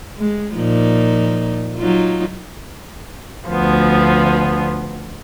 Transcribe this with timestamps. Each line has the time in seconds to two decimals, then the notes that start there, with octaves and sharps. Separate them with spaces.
0.18 G#3
0.56 A#2 F3 D#4
1.78 F#3 D#4 F4
3.47 D2 F3 B3